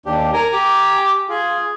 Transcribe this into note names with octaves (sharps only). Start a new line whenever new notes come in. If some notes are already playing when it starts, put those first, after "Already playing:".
D#2 D4 G4
A#4 G#5 A#5
G4
F4 G#4